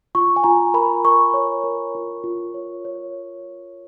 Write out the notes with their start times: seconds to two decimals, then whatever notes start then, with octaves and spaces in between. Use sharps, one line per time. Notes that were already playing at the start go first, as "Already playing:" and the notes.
0.15 F4 C#6
0.36 G#5
0.44 F4 A#5
0.74 A#4 B5
1.04 A#4 C#6
1.34 C#5
1.64 A#4
1.95 F4
2.24 F4
2.54 C#5
2.85 C#5